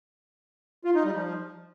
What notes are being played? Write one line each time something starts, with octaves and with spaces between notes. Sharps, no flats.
F4
D#4
G3
F3